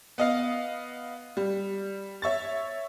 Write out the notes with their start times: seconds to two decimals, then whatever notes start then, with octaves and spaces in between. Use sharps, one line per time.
0.18 B3 D#5 F5
1.37 G3
2.22 C#5 E5 C#6 A6